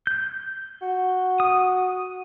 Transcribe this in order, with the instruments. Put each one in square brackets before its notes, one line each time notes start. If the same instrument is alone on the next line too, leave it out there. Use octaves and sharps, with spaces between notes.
[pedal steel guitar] G6
[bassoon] F#4
[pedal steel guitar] D#6